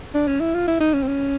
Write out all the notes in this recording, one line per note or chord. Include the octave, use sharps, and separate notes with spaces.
D4
C#4
E4
F4
E4
D#4
C#4
C4
C#4